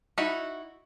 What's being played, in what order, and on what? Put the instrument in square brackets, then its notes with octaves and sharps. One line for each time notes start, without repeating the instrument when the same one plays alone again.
[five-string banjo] D#4 E4 F#4 B5